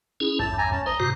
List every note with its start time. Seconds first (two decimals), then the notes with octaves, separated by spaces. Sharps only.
0.20 C#4 E4 G#4
0.39 A1 E2 G2 A5
0.58 G#5 A#5
0.72 C#4 A5
0.86 A1 C5 A#5 D#6
1.00 G2 C3 F#4